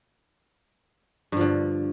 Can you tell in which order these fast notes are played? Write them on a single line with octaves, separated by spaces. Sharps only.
G2 F3 D3